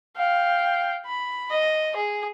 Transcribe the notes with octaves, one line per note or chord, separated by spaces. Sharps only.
F5 G5
B5
D#5
G#4